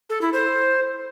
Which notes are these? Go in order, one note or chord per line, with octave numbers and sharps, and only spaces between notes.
A4
E4
C5